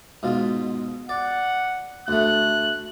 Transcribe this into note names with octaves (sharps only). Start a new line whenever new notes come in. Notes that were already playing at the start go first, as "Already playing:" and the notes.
G#2 B2 F4
D5 F#5
D2 A3 F#6